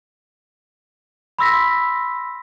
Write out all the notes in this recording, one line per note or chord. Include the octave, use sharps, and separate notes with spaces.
B5 C6 E6 A#6 B6